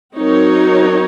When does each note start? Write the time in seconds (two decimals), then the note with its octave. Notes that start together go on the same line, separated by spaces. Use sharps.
0.16 F#3 C4 D#4 A#4 C#5